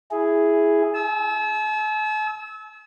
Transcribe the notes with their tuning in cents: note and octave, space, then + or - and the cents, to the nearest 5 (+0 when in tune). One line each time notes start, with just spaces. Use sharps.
E4 +0 G#4 +0
A5 -45 E6 -25